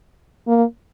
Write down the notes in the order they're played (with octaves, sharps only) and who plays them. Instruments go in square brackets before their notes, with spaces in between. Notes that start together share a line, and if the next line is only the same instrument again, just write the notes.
[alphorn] A#3